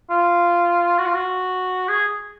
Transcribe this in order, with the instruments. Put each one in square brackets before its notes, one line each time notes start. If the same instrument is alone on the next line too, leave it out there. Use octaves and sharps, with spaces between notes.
[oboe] F4
F#4
F4
F#4
G#4